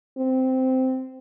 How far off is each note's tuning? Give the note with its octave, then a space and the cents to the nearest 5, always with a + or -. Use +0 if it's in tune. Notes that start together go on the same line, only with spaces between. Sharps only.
C4 -10